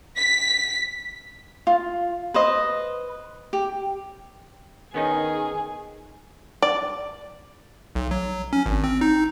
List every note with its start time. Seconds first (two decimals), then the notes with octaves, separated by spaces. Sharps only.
0.17 B6
1.67 F4
2.34 B4 C5 D#5
3.53 G4
4.94 D#3 B3 C#4 D#4 G#4
6.62 D5
7.95 B1
8.11 F#3
8.53 C#4
8.66 G#1
8.84 C4
9.01 D#4